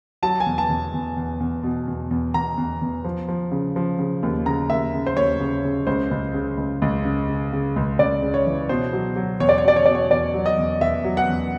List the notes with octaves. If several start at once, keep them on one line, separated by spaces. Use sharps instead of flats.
F#3 A5
G#5
E2
A5
E2
E2
E2
E2
B2
E2
E2
E2 A#5
E2
E2
F3
F3
C#3
F3
C#3
D#2
C#3 A#5
D#2 E5
C#3
C5
D#2 C#5
C#3
C#3
C#2 C5
C#2
C#3
C#2
C#2
C#3
C#3
C#3
C#2
C#2 D5
C#3
C#5
E3
B2 C5
F#3
F#3
E2 C#5
D5
C#5
B2 D5
C#5
B2 D5
C#5
E2 D5
F#3
D#5
E2
E2 E5
F#3
F#5
E2